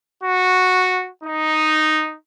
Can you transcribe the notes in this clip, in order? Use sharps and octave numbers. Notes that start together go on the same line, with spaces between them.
F#4
D#4